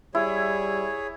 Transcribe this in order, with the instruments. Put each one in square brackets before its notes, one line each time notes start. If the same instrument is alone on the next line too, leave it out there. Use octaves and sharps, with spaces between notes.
[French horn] G3 [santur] E4 [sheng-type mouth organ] G#4 C#5